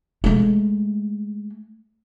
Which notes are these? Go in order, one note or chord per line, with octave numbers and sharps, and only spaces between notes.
G#3 A3